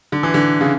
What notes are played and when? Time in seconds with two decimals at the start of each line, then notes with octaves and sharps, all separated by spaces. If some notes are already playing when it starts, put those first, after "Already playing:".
0.12 D3
0.23 E3
0.34 D3
0.61 C#3